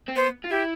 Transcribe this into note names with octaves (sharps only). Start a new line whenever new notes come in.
C4
B3 C5
F4
E4 G4